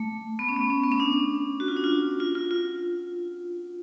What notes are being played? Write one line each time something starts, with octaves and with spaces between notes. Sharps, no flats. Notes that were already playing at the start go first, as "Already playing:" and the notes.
Already playing: A3
B3
C#4
B3
C#4
B3
C#4
D4
F#4
F4
D4
F4
F4
F4
F4